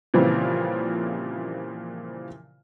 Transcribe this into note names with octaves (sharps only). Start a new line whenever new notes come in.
A#2 C#3 E3 F3 G3 C4